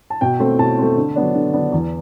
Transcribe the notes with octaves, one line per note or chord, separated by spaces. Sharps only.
A5
B2 G5
A3 C4
B2 A5
A3 C4
D3
F#3 B3 D4
D3
F#3 B3 D4
E2